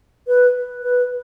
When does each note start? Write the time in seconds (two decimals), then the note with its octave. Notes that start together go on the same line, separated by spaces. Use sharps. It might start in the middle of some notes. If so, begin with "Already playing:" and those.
0.28 B4
0.83 B4